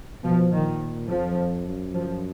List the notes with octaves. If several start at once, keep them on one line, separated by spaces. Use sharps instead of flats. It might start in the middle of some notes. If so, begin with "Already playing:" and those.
B2 F3
A#2 D#3
F2 F3
F#2
F3